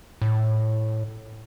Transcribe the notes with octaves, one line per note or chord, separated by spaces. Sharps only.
A2